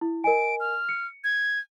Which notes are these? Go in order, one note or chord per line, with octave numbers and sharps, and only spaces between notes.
E4
A#4 D#5 G#5 D7
F6
C#7
G#6